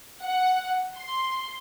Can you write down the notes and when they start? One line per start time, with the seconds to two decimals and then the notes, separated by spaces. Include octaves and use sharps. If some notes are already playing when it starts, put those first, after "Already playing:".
0.22 F#5
0.98 C6